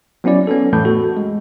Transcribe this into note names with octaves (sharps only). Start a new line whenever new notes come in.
F#3 B3 C#4 E4 D5
B3 C#4 A4
F2 A2 E3 A3 G6
F#4 A4
G#3